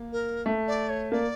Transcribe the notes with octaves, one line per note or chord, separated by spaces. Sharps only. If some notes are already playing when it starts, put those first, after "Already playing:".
Already playing: A#3
A#4
A3
D5
C#5
A#3 D5